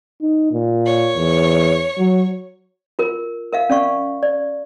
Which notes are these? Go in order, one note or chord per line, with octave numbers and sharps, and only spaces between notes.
D#4
A#2
C#5
E2
F#3
F4 A#4
A#4 E5 F5
C#4 D5 F5 C#6
D5